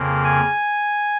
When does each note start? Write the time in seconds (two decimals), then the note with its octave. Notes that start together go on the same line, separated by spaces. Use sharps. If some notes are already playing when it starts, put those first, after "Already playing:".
Already playing: F2 C#3 A#3
0.24 G#5